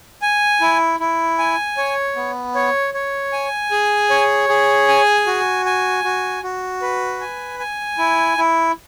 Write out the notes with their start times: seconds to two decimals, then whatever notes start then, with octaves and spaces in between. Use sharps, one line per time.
0.22 G#5
0.61 E4
1.00 E4
1.38 G#5
1.77 C#5
2.16 B3
2.55 C#5
2.94 C#5
3.33 G#5
3.71 G#4
4.10 C#5
4.49 G#4
4.88 G#5
5.27 F#4
5.65 G#5
6.04 F#4
6.43 F#4
6.82 B4
7.21 G#5
7.59 G#5
7.98 E4
8.38 E4